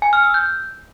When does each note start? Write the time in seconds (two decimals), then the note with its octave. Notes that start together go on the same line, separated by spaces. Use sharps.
0.02 G#5
0.13 F6
0.24 E6
0.34 G6